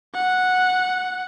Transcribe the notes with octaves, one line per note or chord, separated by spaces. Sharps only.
F#5